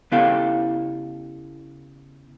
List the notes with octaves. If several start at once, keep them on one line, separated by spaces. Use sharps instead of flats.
C#3 B3 E4 G4 A4 F5